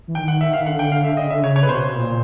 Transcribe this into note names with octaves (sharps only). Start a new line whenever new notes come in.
E3
D#3 G5
F#5
E5
F5
D#3
D3 F#5
G5
F5
E5
D3 D#5
C#3
D3 E5
C#3 C#5
C#5
B4
B2 C5
A#2